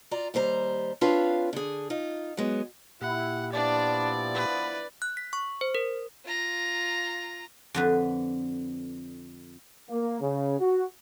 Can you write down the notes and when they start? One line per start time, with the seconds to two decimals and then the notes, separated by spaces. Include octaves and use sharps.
0.11 F4 D5 A#5
0.34 D#2 G3 C5 A#5
1.01 C4 D4 F4 B4 C#5 F5
1.53 D3 G#4
1.90 D#4 F4
2.37 F#3 G#3 B3
3.01 A#2 E4 G4 F#5
3.53 F3 B3 D4 E4 D5
4.35 B4
5.02 F#6
5.17 B6
5.33 C#6
5.61 C5
5.75 A#4
6.25 F4 A#5
7.74 F2 D3 B4
9.89 A#3
10.21 C#3
10.60 F#4